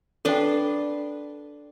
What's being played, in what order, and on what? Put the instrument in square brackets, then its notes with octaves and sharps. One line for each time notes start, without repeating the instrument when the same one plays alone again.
[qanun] D4 B4 C6 [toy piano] A4 G5